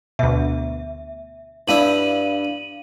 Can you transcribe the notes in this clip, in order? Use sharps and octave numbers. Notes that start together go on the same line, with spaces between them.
D2 B2 E5
G2 D4 E4 F5 D#7 F#7